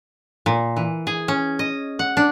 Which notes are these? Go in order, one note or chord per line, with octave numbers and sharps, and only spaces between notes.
A#2
E3
G#4
C#4
D#5
F#5
D4